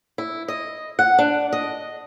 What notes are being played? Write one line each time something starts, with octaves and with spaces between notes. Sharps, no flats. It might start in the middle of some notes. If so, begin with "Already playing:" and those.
E4
D#5
F#5
D4
D#5